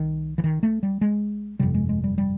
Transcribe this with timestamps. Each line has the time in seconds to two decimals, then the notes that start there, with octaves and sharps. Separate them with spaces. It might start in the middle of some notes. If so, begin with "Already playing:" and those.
Already playing: C2 D#3
0.38 E3
0.44 D#3
0.63 A3
0.83 G3
1.01 G#3
1.59 G1 F2 C3 G3
1.74 G#3
1.89 G#3
2.04 G3
2.18 G3